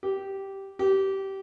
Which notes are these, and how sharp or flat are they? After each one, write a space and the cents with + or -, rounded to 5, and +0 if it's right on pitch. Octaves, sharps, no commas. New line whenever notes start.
G4 -10
G4 -20